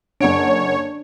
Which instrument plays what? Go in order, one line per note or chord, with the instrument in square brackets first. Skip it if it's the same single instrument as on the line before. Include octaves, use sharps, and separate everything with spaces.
[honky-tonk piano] F#1 F#5 D7 [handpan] D4 [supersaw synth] C#5